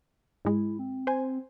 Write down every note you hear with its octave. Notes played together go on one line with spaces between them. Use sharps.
G#2 G#3 E4
C4
C5 G#5